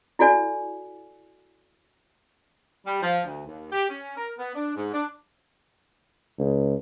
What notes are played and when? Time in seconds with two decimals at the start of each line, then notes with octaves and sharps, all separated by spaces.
0.19 E4 F#4 A4 D5 G#5
2.86 G3
3.03 F3
3.25 D2
3.46 D#2
3.72 G4
3.89 C#4
4.18 A#4
4.38 B3
4.55 D4
4.76 G#2
4.93 D4
6.39 C#2